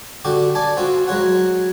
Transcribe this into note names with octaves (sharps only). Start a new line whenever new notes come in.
D3 F#4 G4
D5 G#5 A5
C4 F4 F#4
F#3 G#3 C#5 F#5